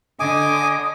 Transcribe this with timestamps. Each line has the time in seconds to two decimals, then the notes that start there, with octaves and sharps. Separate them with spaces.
0.20 D3 D#5 G#5 D6 D#6